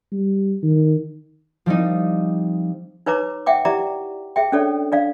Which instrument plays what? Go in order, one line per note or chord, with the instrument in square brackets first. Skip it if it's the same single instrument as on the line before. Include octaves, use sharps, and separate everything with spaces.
[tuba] G3
D#3
[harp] F3 G3 C4 D#4
[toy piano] D#4 B4 C#5 A#5 D6
E5 F#5 G5 D6
E4 G4 D5 E5 A#5 D6
G#4 E5 G5
C#4 D4 A4 C#5 D5
D4 D5 F5